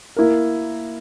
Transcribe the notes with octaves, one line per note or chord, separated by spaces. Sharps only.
A#3 E4 A#4